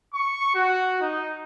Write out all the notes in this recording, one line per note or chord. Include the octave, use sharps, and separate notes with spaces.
C#6
F#4
D#4